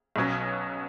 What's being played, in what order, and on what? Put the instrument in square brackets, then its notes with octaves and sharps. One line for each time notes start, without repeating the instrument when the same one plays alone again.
[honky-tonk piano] B1 B2 F#3 C#4